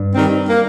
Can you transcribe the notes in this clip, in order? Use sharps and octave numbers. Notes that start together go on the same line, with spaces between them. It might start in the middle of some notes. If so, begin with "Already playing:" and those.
Already playing: G2
D#3 G3 C4
A#3